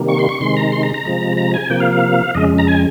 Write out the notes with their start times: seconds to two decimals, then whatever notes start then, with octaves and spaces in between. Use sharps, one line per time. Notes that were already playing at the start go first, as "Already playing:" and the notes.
Already playing: C3 D#3 G3 A#3
0.08 C#6
0.19 C6
0.29 C#6
0.41 C3 D#3 G#3 C6
0.57 A#5
0.72 C6
0.83 A#5
0.94 A#5
1.05 C3 F3 G#3
1.37 A#5
1.54 G#5
1.70 C3 F3 A#3 G5
1.80 F5
1.92 F5
2.35 F2 C#3 G#3 D#5
2.58 A#5
2.68 G#5